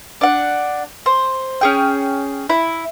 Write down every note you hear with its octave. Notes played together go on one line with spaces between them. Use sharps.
D4 F#5
C5
C#4 G#4 G5
E4